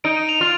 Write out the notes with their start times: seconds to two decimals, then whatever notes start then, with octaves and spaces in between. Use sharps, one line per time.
0.04 D#4 D7
0.17 D#7
0.29 F7
0.41 F4